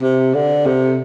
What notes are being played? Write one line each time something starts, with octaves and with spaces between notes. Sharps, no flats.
C3
D3
C3